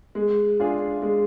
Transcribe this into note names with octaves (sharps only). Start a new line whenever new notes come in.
G#3
D4 F4 G#4
G#3